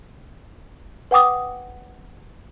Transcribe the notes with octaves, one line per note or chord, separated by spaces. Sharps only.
B4 F#5 G5 D6 D#6